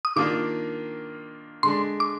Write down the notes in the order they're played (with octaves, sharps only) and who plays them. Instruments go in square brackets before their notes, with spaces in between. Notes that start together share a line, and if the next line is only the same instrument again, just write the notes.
[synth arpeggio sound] D#6
[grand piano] D#3 A#3 D4 F4 [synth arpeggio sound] D6
[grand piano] D3 G#3 D4 [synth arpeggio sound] C6
[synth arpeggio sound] D6